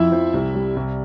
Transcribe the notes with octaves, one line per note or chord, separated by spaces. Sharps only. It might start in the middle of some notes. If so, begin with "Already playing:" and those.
Already playing: F2 F3 E4 E5
F3
C2
G3
C2